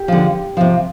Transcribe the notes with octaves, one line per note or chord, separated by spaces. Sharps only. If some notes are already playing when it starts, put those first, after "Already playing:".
Already playing: G4
D3 F3
C3 F3